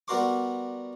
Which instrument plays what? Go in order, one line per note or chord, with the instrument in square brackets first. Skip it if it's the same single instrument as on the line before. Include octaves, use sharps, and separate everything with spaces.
[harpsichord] G3 B3 F#4 A#4 C6 D6